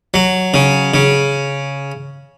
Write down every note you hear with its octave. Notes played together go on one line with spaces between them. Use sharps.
F#3
C#3
C#3